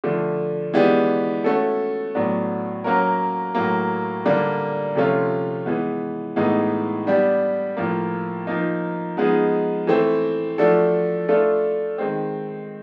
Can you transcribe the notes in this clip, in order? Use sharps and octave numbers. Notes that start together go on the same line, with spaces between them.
D3 F3 A3
E3 G#3 B3 D4 G4
A3 C#4 F#4 A4
A2 F#3 B3 D4
F#3 A#3 C#4 F#4 A#4
A2 F#3 A#3
D3 G3 A#3 D4
C3 F3 A3 C#4 F4
E3 G#3 B3
A2 E3 G#3 B3 D#4
G3 B3 D4 G4
A2 F3 A#3
F3 A#3 D#4
F3 G#3 B3 D#4 G#4
E3 A3 C4
F3 A3 D4 F#4 A4
A3 D4 F4 A4
D#3 G#3 C4